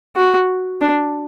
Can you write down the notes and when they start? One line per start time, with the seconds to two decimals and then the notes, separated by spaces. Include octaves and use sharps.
0.16 F#4
0.81 D4